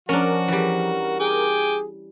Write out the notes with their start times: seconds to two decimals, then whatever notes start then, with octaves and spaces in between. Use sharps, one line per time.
0.09 F3 C#4 D4 F#4 A#4
0.48 E3 G3
1.20 G#4 G5 G#5 D6